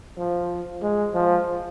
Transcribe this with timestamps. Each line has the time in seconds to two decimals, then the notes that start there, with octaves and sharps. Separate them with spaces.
0.18 F3
0.82 G#3
1.14 F3